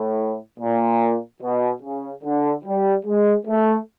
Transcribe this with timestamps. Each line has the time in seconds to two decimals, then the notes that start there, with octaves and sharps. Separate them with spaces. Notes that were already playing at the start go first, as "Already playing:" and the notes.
Already playing: A2
0.60 A#2
1.41 B2
1.83 C#3
2.24 D3
2.65 G3
3.06 G#3
3.46 A3